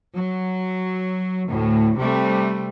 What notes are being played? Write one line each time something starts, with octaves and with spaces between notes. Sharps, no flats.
F#3
D2 A2
C3 G3 A3